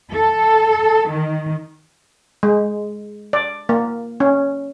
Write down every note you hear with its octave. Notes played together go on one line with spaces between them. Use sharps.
A4
D#3
G#3
D5
A#3
C#4